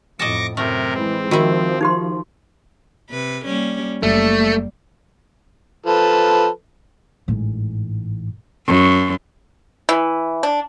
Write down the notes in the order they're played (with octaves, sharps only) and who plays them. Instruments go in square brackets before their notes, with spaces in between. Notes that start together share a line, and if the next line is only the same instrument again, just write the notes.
[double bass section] F2 A2 [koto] D#5 A5 [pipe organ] C#6 D6 A#6
[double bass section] F#2 [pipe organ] C3 A#4 [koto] A3
[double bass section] E3 G#3 [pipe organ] C4
[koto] D#3 E4 [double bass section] F3 [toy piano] F#4
[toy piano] D#4 G4 C6
[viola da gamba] C3 B4
G3 A#3 C#4
[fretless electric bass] F#1 [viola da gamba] G3 A#3 [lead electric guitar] A3
[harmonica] F3 A4 B4
[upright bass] A1 G#2
[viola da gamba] F#2
[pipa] E3
D4